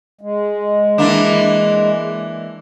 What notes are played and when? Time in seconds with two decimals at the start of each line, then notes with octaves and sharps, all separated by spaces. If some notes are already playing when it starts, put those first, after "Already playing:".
0.21 G#3
0.98 E3 A#3 D4